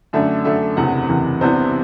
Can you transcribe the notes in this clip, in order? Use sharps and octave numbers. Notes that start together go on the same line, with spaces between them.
F#2 D3 A3 D4 E5
F#2 D3 A3 D4 E5
F#1 E2 C3 E3 F#5
F#1 E2 C3 E3
C2 C3 E3 B3 D4 C5